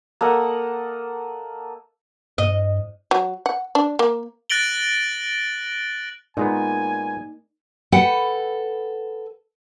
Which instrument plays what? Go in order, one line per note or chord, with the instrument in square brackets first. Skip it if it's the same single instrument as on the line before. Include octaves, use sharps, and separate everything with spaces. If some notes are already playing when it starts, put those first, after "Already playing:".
[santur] A#3 A4 D#5 F#5
[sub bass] G2 [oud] D#5
[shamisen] F#3
F#5
D4
A#3
[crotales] F#6 A6 A#6 D7 F#7 G7
[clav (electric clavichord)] A#2 G#3 B3 [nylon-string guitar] A#3 D#4 [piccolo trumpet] G#5
[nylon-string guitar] A4 B4 F#5 G5